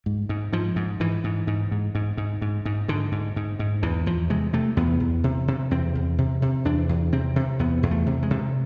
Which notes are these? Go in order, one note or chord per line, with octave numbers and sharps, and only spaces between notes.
G#2
G#2
G#2 F3
G#2
G#2 E3
G#2
G#2
G#2
G#2
G#2
G#2
G#2
G#2 D3
G#2
G#2
G#2
E2 E3
E2 F3
C3 G#3
C3 A3
E2 B3
E2
C3
C3
E2 C4
E2
C3
C3
E2 D4
E2
C3 C4
C3
E2 B3
E2
A3
C3
G#3
C3